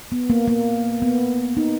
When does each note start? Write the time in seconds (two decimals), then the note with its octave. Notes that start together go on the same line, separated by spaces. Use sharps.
0.12 B3
0.30 A#3
0.48 A#3
1.02 B3
1.57 D#4